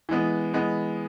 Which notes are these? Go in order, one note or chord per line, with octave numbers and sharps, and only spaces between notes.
E3 G#3 B3
E3 G#3 B3